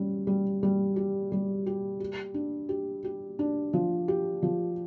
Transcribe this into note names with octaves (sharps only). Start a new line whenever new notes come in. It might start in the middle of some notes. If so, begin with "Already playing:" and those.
Already playing: G3 C#4
G3
G3
G4
G3
G4
G4
D4
G4
G4
D4
F3
G4
F3